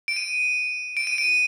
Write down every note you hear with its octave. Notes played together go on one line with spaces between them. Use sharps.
D7
D#7
D7
D#7
D7